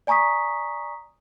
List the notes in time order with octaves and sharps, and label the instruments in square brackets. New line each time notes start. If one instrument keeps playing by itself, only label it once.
[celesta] D5 G#5 A#5 C#6 D#6 B6